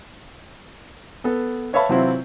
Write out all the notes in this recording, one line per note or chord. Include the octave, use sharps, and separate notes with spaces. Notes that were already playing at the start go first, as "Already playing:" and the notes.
B3 A4
B4 C#5 E5 F5 A5 B5
C3 E3 F#3 C4 E4 F4